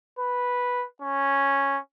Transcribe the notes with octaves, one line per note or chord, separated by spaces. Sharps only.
B4
C#4